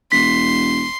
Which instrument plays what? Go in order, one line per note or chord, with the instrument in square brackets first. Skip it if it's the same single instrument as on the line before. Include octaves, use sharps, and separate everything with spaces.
[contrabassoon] E1 [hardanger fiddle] C6 [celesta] B6